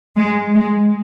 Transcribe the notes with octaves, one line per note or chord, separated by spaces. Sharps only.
G#3
G#3